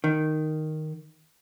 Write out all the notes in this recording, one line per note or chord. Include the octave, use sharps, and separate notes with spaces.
D#3